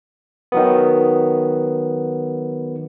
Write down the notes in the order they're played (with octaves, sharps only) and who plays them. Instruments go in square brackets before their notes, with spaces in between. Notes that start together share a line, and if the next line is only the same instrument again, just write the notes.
[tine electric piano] D#3 F#3 B3